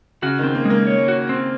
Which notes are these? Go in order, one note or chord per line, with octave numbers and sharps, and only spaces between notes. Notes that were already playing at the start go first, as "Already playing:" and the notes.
C#3 F#4
D#3 C4
A#3
G#3 A#3
C#5
F#4
C4